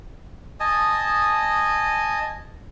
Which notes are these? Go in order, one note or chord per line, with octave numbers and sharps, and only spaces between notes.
D#5 G#5 A5 D#6